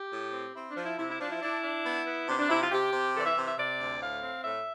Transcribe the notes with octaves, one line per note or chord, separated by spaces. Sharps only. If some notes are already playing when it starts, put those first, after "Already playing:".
Already playing: G4
A2
C4
C4 E4
D4
F3
E4
C3 E4
E4
F3 D4
E4
D4 E4
D4
B3
B3
C3 D4
D4
C3 E4
F4
C3 G4
C3
E3 A4
D5
E5
C3
E5
C3 D5
D2
A2 F5
C4
A2 E5